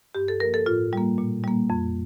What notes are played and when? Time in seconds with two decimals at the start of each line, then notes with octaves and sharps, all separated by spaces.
0.15 G2 G4
0.28 A4
0.40 F3 A#3 A#4
0.54 A4
0.66 A2 F4
0.93 G3 A#3
1.18 A#2
1.44 G3 A#3
1.70 F2